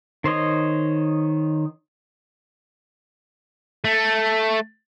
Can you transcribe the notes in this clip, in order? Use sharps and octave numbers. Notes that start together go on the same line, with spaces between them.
D#3 C5 C#5 D#5
A3